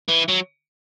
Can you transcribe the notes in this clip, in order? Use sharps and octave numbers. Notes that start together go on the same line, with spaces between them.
E3
F#3